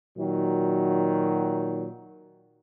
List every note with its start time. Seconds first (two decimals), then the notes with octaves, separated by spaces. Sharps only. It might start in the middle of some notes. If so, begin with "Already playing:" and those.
0.17 A#2 D#3 F#3